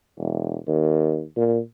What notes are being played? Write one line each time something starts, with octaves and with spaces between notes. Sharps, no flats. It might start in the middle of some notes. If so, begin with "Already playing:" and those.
E1
D#2
A#2